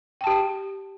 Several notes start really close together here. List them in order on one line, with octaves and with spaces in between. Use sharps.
G5 A5 G4